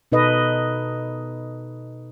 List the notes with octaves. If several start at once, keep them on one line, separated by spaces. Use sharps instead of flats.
B2 D#4 A4 B4 D#5